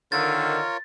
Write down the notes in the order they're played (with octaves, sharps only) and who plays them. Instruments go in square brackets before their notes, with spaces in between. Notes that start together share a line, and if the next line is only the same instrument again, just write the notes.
[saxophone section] D3 D#3 [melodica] F4 A#4 C#5 [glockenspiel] A6